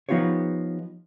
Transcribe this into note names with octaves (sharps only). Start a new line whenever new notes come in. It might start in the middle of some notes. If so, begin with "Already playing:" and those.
F3 B3 D#4 F4 G4 C#5